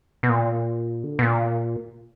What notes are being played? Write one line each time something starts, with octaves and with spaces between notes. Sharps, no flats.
B2
A#2
D3
B2
A#2